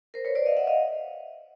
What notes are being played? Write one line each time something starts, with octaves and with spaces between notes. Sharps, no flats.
A#4 C5
B4 C#5
C5 D5
D#5 F5
E5 F#5
D#5 F5